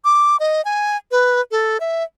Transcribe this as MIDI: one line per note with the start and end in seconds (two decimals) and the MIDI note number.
0.05 0.37 86
0.40 0.64 75
0.65 0.97 80
1.11 1.41 71
1.51 1.77 69
1.80 2.03 76